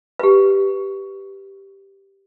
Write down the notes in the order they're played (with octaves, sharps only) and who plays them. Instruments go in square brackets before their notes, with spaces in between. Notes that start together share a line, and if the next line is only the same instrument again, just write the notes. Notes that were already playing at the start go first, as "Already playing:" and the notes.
[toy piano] G4 B4